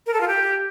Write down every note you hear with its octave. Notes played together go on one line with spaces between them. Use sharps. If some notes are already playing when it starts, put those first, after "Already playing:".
A#4
A4
F4
G4